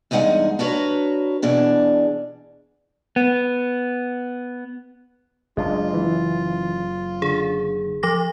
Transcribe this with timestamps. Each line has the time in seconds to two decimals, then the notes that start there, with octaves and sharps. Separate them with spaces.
0.11 E2 G2 G#3 D#4 F#5 G#5
0.59 D4 F#4 A#4 B4 C#5
1.42 B2 E3 D4 G#4
3.16 B3
5.57 F#1 C#3 G#3 D4 F4
5.94 E3
7.22 D3 G#4
8.03 F3 D6 A#6